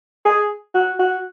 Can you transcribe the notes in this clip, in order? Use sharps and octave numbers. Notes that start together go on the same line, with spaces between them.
G#4
F#4
F#4